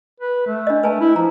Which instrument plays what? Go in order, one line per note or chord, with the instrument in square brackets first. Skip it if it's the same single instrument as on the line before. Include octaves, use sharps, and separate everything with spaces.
[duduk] B4
A3
[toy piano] D4 D#5
[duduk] A3 [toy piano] B4 G#5 A5
[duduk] E4
[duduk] F3 [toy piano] A#5